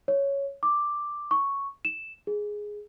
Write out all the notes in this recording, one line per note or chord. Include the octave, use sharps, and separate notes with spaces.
C#5
D6
C#6
E7
G#4